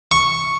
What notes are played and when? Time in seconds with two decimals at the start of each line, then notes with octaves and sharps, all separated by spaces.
0.11 C#6